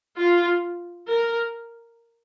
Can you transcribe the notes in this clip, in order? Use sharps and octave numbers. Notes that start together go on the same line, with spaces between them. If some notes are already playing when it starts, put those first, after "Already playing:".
F4
A#4